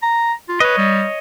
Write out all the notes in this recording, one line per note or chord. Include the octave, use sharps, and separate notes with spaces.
A#5
F4
B4 C#5 D#5
G3